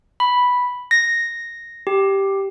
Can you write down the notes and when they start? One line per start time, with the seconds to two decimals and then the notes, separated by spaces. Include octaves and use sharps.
0.20 B5
0.91 A#6
1.87 G4